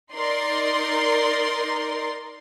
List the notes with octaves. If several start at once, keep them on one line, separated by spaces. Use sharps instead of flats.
D#4 A#4 D5 C6